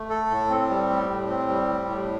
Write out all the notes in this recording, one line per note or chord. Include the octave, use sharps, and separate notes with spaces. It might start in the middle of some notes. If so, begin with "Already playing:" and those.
Already playing: A3
A4
A2
C4
G3
A2
A2
C4
G3
A2
A2